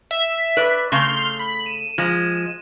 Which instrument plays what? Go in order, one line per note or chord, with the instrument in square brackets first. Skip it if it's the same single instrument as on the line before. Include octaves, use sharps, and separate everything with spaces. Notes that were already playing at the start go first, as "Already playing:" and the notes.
[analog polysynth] E5
[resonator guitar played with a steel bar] B4 D5
[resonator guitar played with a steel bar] C#3 A3 [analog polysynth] C6 F6 G6
[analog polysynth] B5
D#7 E7
[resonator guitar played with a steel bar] F3 G#3